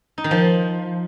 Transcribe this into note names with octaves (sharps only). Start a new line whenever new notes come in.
D#4
D#3
F3